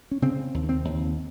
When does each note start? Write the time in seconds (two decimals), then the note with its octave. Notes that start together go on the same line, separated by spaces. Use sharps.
0.11 C#4
0.22 C#3 C4
0.54 D#2
0.69 C4
0.85 D#2